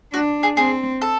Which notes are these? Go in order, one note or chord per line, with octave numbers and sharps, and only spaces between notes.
D4 F#4
G#4
C4 G#4
A4